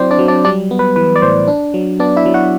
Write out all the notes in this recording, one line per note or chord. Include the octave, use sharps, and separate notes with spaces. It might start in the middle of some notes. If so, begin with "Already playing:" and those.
Already playing: F#3 C4 E4 C5 D5
D4 D5
F#3
D4 D5
G3 D4 D5
B3
B4
E3 B4
D5
A2 C5
D4
F#3
B3 D4 D5
E4 E5
F#3
F#4 F#5